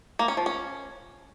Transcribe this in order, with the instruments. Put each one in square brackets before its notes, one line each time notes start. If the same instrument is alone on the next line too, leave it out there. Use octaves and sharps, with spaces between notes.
[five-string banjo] A#3
C#4
F3
C#4